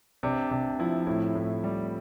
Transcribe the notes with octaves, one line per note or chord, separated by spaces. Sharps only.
C3 D4
C3 D4
F3 E4
A2 E4
A2
G3